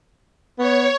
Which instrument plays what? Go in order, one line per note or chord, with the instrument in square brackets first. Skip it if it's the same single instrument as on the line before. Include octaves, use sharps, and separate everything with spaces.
[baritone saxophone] B3 [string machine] C#5